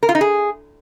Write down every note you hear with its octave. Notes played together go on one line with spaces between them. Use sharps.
A#4
F4
D#4
G#4